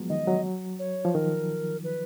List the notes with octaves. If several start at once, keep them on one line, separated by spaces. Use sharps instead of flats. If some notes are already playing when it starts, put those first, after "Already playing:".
Already playing: F3 F#3 G#3 B3
D#3 D#5
F#3
C#5
F3
D#3 A#4
B4